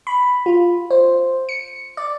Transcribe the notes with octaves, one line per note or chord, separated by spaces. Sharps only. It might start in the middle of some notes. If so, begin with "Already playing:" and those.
B5
F4
C5
C#7
D5